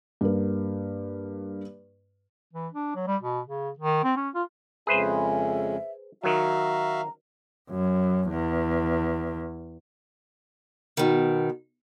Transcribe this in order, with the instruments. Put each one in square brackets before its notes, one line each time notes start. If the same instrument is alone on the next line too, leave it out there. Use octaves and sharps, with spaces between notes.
[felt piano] G2 A#3
[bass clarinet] E3
D4
F#3
G3
B2
C#3
D#3
C4
C#4
F4
[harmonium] F2 C#3 G#3 [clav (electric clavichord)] G#4 B4 C5 [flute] E5
[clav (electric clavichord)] D#3 F#3 [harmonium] F#4 E5 F5 [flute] A#5
[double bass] F#2
E2
[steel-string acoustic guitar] B2 D#3